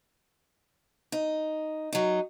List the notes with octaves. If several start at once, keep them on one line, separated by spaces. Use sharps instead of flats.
D#4
F#3 D#4